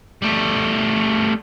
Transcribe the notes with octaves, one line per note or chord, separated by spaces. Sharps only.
G3 A3